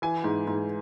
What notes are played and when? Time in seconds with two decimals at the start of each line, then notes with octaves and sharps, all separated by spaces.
0.02 E3 G#5
0.24 G#2
0.47 G#2